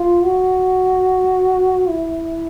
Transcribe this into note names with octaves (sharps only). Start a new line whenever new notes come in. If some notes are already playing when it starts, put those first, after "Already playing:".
Already playing: F4
F#4
E4